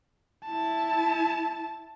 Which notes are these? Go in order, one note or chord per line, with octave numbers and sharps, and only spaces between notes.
E4 A5